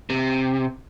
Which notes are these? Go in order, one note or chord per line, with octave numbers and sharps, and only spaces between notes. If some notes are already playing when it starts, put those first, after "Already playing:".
C3